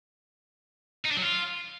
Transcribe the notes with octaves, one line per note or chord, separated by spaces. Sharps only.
D#4
D4
F#3
F4